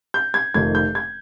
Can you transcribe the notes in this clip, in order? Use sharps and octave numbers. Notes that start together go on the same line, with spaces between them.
G6
G#6
F1 F2 C3 D#3 G#6
G6
G#6